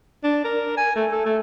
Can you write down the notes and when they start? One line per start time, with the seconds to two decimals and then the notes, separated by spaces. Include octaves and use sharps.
0.24 D4
0.45 A#4
0.77 G#5
0.96 A3
1.11 A4
1.26 A3